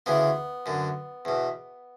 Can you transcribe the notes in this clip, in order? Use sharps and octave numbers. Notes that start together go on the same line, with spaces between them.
D2 C#3 E3 B3
F#2 D3
E2 B2